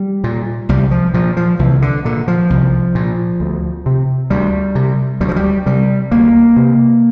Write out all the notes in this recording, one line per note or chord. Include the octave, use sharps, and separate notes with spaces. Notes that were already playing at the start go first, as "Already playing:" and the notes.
Already playing: G3
A#2
C2 G3
F3
A#2 F3
F3
C2 E3
D3
A#2 D3
F3
C2
A#2
D2
C3
D2 G3
C3
D2 G3
F3
G3
C3 G3
D2 A#3
C3